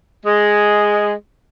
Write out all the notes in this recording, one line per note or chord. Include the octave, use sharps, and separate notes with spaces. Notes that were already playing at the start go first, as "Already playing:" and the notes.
G#3